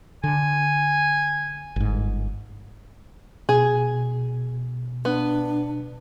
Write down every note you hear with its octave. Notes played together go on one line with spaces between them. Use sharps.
D3 G#5
G1 G#2
B2 G#4
B3 D4